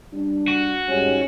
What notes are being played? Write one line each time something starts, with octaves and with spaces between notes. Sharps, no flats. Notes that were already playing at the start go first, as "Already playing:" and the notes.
G3 D4
F#4
G#2 G3 C#4